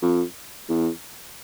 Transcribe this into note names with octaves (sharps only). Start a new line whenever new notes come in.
F2
E2